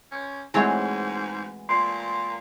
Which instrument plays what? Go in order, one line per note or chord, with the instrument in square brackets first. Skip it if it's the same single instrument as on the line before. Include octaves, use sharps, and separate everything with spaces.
[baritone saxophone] C#4
[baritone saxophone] G#2 [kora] E3 G#3 F#4 [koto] A3 C4 C#5
[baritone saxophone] A#2 [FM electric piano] C6